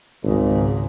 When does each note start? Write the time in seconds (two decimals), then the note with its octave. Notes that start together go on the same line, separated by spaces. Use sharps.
0.23 G#1 C#2 G#2